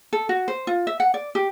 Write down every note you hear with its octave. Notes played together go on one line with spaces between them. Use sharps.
A4
F#4
C5
F4
E5
F#5
D5
G4